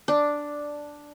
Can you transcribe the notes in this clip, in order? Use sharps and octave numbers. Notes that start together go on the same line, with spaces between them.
D4